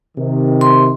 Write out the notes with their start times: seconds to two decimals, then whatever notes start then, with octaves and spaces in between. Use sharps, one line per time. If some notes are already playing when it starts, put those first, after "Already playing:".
0.17 C3 D#3
0.61 C6